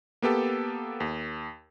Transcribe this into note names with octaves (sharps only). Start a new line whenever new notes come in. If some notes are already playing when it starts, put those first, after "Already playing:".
A#3 B3 G4 A4
D#2